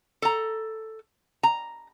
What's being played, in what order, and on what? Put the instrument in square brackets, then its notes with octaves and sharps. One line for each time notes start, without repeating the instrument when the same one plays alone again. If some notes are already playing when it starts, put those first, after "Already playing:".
[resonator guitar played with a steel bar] A4 A#5
A#5